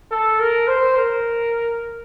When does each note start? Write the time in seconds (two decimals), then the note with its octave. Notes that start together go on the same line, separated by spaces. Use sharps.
0.11 A4
0.40 A#4
0.68 C5
0.97 A#4